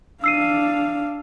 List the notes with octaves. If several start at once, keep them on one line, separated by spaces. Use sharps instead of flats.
D4 F5 E6 C7 D#7